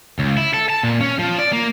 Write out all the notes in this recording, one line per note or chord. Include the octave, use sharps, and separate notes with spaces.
C#2
E4
A4
A5
A#2
C#4
F3
D5
A#3